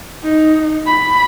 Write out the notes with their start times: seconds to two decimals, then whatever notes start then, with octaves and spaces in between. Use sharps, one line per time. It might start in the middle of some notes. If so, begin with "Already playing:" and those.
0.24 D#4
0.86 B5